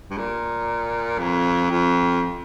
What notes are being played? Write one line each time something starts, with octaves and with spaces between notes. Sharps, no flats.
G2
A#2
F2
F2